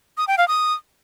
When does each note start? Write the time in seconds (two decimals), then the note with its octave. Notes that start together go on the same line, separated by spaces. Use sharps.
0.17 D#6
0.28 G5
0.38 F5
0.48 D#6